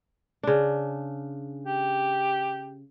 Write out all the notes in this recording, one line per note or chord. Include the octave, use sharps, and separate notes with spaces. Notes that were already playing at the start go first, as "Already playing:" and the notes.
C#3 D4
G4